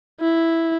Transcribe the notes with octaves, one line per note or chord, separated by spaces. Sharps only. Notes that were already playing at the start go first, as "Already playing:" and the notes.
E4